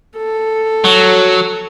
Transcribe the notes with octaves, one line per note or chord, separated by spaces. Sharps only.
A4
F#3